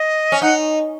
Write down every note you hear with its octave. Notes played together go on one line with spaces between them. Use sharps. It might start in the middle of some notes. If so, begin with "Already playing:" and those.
Already playing: D#5
C#4
D#4 F#5